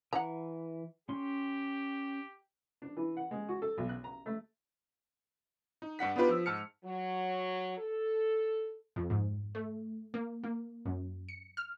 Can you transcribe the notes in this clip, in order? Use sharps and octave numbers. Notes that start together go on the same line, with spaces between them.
E3 F#5 A#5
C#4 G4 C6
D4
E3
F#5
G#3
F#4
A4
B1
F#6
A#5
A3
D#4
G2 D4 F#5 B6
B3 D4 D#4 F4 G4 B4
F3 E6
G#2 A5 F6 C#7
F#3
A4
F2
G#2
A3
A#3
A#3
F#2
C#7
F6